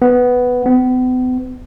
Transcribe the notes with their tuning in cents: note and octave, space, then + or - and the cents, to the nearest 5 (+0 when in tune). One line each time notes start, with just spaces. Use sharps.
B3 +5
B3 +45